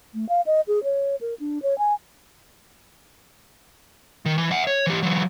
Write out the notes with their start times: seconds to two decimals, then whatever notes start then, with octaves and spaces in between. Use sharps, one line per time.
0.14 A3
0.29 F5
0.46 D#5
0.68 G#4
0.84 C#5
1.21 A#4
1.39 D4
1.63 C#5
1.78 G#5
4.26 D#3
4.38 E3
4.51 E5 F#5
4.67 C#5
4.87 E3 G4
5.03 E3 F#3